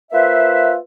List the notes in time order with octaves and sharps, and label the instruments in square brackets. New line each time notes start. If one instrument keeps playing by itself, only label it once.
[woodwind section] A#3 F4 B4 C5 E5